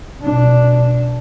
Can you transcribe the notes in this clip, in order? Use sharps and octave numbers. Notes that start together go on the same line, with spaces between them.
B2 D4